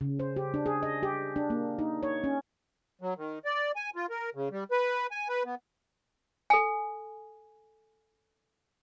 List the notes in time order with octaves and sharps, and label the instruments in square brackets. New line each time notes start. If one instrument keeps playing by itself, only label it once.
[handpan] C#3
C5
G4
D4
G#4
D#5
G4
D4
A#3
D#4
C#5
C#4
[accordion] F#3
D#3
D5
G#5
F4
A#4
C#3
G3
B4
G#5
B4
B3
[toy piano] A4 G#5